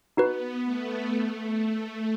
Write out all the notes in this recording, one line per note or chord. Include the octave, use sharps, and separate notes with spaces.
B3 D#4 F#4 B4
A3
A3
A3